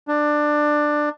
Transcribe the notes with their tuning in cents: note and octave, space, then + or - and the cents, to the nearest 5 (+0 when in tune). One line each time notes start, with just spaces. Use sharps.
D4 +15